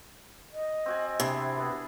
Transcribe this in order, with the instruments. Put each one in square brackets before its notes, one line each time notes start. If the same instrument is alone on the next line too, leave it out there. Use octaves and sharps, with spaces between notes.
[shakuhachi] D#5
[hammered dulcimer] C4 F#4 G#5
[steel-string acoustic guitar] C3 [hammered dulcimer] D4 E4 G#4
[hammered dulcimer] B3 [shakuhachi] B4